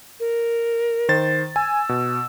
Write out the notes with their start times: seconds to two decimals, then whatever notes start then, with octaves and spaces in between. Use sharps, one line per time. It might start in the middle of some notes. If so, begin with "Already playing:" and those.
0.20 A#4
1.09 D#3 C5 A6
1.56 G#5 E6
1.89 B2